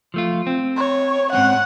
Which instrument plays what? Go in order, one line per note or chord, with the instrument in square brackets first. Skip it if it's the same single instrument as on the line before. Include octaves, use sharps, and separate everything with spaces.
[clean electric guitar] F3 A3 F4
C4
[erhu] C#5
[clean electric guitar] G#2 C4 C#4 [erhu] F#5